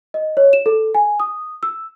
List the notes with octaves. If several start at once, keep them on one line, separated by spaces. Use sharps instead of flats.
D#5
C#5
E7
A4
G#5
D#6
E6